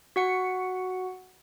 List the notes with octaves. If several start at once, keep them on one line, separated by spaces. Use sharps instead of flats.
F#4 F#5 C#7